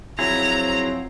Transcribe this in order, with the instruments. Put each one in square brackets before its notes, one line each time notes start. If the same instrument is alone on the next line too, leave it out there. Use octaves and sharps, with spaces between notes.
[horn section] F3 F#3 C4 [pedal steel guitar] E4 G#4 [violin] A#5